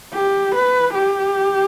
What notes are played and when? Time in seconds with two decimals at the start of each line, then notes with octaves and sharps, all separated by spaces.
0.14 G4
0.55 B4
0.95 G4